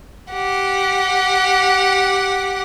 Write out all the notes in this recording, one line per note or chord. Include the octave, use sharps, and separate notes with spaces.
G4 F#5